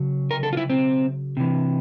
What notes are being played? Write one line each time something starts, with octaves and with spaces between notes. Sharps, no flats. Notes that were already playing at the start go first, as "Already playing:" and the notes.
Already playing: C#3 F#3
A#4
A4
F4
E4
C4
C3 E3